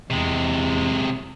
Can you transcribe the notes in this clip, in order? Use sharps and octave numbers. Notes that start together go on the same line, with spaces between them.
E2 C3 G#3